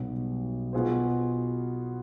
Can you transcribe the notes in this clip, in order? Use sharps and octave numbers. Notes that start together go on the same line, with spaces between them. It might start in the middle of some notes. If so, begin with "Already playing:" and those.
Already playing: B1 B2 G3 B3
B2 B3 F4 G#4 C5